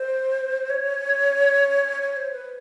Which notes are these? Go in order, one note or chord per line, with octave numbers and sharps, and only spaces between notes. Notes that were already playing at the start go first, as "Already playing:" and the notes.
Already playing: C5
C#5
C#5
C5
B4